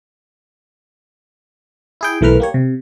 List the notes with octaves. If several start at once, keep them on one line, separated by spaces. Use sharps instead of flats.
E4 G#4 G5
B1 E3 A3 A#4 B4 F6
A#3 G4 C#5
C3